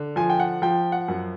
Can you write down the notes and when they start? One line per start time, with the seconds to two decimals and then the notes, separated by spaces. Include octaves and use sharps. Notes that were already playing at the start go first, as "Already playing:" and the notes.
Already playing: D3
0.16 F3 G#5
0.30 G5
0.40 F#5
0.62 F3 G5
0.92 F#5
1.08 F#2